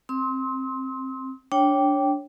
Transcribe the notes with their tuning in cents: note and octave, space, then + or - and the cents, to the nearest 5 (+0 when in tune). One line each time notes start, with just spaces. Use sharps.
C4 +15 C6 +10 E6 -45
D4 -15 C#5 -10 G5 -5